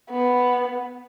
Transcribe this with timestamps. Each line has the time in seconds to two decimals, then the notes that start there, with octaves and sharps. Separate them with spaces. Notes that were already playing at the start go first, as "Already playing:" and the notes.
0.10 B3